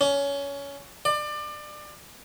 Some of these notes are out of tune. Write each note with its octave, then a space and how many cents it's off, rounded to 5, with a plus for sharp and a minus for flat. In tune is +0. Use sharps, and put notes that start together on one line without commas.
C#4 +20
D5 +25